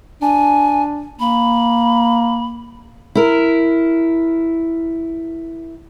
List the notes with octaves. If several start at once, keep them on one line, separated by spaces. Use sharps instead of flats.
D4 G#5
A#3 B5
E4 A#4